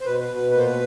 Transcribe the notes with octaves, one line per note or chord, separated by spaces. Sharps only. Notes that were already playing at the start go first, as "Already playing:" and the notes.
C5
B2 B4
B4
B2
B4
A#2 B4
C5
B4